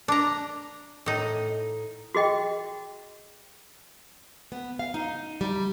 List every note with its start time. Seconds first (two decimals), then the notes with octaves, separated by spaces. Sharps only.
0.08 D4 A#5
1.06 A2 D#4
2.15 F#4 G#4 D#5 G5
4.52 B3
4.79 F5
4.94 D#4
5.41 G3